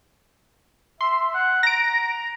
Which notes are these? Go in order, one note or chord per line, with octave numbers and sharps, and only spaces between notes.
E5 C6
F#5
A#5 A#6 D7